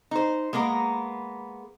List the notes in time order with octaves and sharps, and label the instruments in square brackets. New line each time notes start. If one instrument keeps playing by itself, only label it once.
[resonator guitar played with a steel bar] D#4 C5
G#3 A#3 B3 A#4